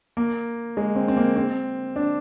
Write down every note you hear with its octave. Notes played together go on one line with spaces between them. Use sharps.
A#3
G#3
C4
C4
A#3
C4
D4